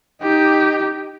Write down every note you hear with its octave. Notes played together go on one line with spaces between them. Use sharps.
D#4 G4